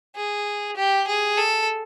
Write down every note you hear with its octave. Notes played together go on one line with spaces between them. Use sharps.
G#4
G4
G#4
A4